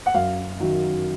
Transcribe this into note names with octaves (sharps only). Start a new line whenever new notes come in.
F#5
F#2 F5
D#3 F#3